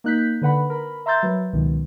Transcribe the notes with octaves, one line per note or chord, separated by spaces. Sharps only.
A#3 D#4 F#6 G6 B6
D3 B4 F#5 B5
A#4 B5
E5 A#5 C6 E6 G6 A6
F#3 B4
C#2 B2 D#3